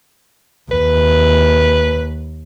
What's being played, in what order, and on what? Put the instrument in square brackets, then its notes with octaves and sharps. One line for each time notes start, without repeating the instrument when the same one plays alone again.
[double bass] D#2 [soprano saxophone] B4